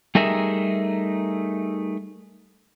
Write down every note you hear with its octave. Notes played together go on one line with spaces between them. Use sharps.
G3 A3 D#4 G#4 A#4 E5